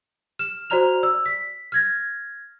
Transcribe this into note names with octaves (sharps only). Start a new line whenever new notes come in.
F6 E7
F#4 C5 D5 A#5 F6 F7
D5 E6
B6
F6 G#6 A#6